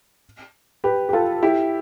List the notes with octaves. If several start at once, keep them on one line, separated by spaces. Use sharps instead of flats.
G4 B4
G4
F4 A4
E4 G4